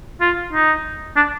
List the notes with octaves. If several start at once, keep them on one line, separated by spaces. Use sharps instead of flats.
F4
D#4
D4